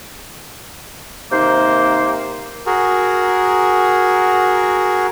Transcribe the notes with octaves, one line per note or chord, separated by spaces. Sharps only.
C3 D#3 A#3 C5
F#4 G#4 A#4